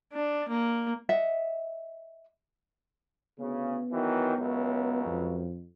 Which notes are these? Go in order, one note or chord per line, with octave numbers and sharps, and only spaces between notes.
D4
A#3
D#5 E5 F#5
D2 C#3 B3
D#3 E3 F#3
C#2 F#2
F2